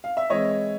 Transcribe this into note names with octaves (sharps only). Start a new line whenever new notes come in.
F5
E5
E3 G#3 C4 E4 C#5 D#5